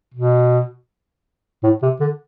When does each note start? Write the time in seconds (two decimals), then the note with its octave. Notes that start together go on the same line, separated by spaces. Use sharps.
0.14 B2
1.63 A2
1.82 C3
2.00 D3